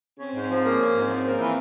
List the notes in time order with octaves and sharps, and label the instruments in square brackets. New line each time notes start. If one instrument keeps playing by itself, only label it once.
[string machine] C4 [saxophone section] C#4
[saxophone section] G#2
F3
A#3
C#4
G#2
F3
A#3
E3